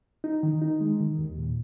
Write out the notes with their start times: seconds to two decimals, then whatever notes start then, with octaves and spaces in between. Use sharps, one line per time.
0.24 D#4
0.43 D#3
0.62 D#4
0.81 G#3
1.00 D#3
1.19 D#2
1.38 A#2